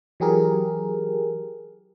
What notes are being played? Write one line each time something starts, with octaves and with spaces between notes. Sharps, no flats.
E3 F#3 G4 G#4 A#4